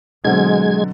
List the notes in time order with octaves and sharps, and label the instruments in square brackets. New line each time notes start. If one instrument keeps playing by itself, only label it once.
[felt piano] B2 D3 C4 [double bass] F#3 [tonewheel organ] G#3 G#6